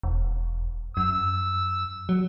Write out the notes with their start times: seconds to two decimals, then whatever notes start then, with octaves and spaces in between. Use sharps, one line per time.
0.03 E1
0.97 F#2 E6
2.09 F#3